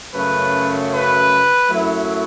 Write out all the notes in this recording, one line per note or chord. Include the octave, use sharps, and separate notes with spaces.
F#2 C#3 F#3 A3 B4
B4
F#2 F#3 A3 E4